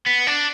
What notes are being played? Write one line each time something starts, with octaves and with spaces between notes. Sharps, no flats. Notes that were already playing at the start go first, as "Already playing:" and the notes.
B3
D4